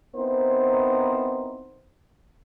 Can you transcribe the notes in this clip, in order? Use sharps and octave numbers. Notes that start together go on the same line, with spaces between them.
B3 C4 D#4 E4 A#4 C5